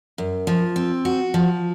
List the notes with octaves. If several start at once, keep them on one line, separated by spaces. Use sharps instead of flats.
F#2
F3
C4
F#4
F3